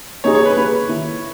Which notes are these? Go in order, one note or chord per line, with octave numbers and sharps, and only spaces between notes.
A#3 D#4 G#4 C#5
C#5
B4
A#3 D#4 G#4 B4
D#3 A#3 E4